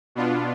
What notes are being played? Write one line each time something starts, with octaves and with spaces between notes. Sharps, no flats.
B2 B3 D4 F4